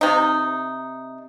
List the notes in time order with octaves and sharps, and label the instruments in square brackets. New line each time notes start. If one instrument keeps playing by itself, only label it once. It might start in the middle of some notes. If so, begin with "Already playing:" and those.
[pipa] C3 D#4